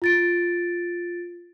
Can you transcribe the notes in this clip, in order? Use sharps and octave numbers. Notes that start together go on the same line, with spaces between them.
F4 A6 D7